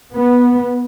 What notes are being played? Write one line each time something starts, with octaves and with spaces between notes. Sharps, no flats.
B3